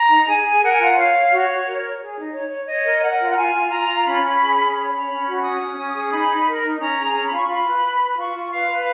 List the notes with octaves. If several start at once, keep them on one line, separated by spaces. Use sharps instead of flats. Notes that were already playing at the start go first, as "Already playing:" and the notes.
Already playing: A#5
D#4
G#4 G#5
G#4
A#4 F#5
G#5
F4 F#5
C#5 F5
C#5
F#4 C#5
F#4
A#4
C#5
G#4
D#4
C#5
C#5
C#5 D#5
A#4
A#4 F#5
F4
F#5
F4 G#5
F4
F4 A#5
F4
C#4 B5
C#4
G#4
C#4
C#5 B5
C#5
C#4
F#4
C#4 D#6
C#4
C#4
G#4
D#4 B5
D#4
A#4
D#4
C#4 A#5
G#4
C#4 A#5
B5
F4 C#6
F4 B5
B4
B4
B4
B5
F4 C#6
F4
B4 F5
B4